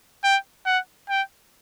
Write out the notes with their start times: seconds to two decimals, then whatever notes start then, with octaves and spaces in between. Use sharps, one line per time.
0.24 G5
0.66 F#5
1.09 G5